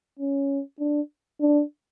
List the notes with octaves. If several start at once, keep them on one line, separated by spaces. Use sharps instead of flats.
C#4
D4
D4